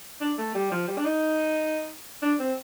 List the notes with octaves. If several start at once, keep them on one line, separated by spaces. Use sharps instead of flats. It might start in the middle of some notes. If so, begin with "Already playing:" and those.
D4
A3
G3
F3
G3
D4
D#4
D4
C4